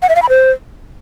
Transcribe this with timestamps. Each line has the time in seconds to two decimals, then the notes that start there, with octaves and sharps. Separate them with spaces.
0.02 F#5
0.09 E5
0.16 F5
0.22 B5
0.29 C5